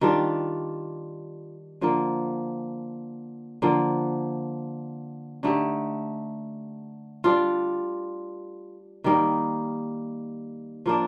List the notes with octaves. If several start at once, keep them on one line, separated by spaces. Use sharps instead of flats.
D#3 G3 D4 F4
D3 F3 A#3
D3 F3 A#3
D3 A3 D#4 G4
G3 D4 F4
D#3 G3 A#3 D#4
F3 A#3 D4